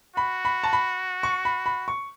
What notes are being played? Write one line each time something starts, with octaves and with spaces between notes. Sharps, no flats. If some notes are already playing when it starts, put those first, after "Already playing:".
F#4 B5
B5
A5
B5
C#6
B5
B5
C#6